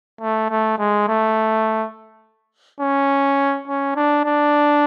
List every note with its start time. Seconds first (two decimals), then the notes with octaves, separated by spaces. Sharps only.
0.21 A3
0.50 A3
0.78 G#3
1.08 A3
2.81 C#4
3.68 C#4
3.96 D4
4.25 D4